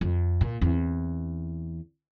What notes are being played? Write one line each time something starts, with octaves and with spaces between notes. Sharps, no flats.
F2
A#2
E2 C4